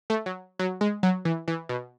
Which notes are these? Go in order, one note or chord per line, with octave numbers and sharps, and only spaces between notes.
A3
F#3
F#3
G#3
F#3
E3
E3
B2